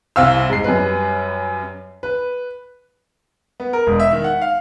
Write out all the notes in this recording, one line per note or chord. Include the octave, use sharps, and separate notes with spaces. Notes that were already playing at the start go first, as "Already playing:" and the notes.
C2 C4 F5 E6
G#2 C7
F#2 G3 B4
B4
B3
A#4
E1
E5
D#3
F#5
F5